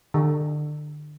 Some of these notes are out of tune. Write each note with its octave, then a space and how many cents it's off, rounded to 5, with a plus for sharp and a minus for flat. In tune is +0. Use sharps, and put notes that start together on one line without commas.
D3 +30